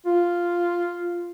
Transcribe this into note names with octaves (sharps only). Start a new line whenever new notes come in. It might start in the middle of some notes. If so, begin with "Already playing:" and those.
F4